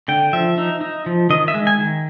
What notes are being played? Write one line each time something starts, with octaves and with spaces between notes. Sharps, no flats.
D3 G5
F3 E5
D#4
D#4
F3
D#3 D#5
E5
G#3
G#5
D#3